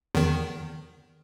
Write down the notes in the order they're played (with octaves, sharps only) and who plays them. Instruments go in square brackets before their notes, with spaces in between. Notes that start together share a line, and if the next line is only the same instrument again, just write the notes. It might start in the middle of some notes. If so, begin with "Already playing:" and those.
[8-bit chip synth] E2 D#3